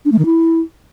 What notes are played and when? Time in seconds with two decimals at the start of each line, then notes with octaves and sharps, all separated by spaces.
0.05 D4
0.12 A3
0.19 D#3
0.25 E4